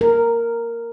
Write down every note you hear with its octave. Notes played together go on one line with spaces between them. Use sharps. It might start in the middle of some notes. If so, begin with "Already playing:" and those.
A#4